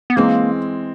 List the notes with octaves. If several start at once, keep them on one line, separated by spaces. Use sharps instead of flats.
B3
E3 G#3 A#3 C4